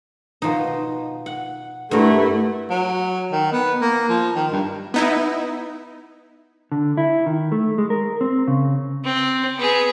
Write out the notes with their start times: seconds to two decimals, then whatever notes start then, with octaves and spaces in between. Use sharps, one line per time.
0.42 B2 F3 D#4
1.26 F#5
1.91 G2 A3 E4 F#4 A#4
2.70 F#3
3.32 D#3
3.52 B3
3.81 A#3
4.09 F3
4.35 D#3
4.52 G2
4.94 B3 D#4 E4
6.72 D3
6.97 E4
7.26 D#3
7.52 A3
7.78 G#3
7.90 A#4
8.21 C4
8.48 C#3
9.04 C4
9.57 B3 G#4